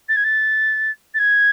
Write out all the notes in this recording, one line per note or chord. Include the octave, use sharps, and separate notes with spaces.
A6
G#6
A6
A6
G#6